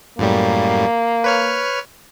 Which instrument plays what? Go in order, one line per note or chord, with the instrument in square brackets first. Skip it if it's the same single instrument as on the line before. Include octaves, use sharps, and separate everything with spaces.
[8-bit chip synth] F#2 A2 G3 [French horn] A#3
[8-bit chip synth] B4 C#5 F6